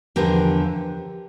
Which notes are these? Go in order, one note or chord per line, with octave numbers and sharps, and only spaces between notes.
E2 D3 F3 G4 A#4